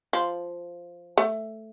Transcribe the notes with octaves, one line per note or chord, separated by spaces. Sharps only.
F3
A3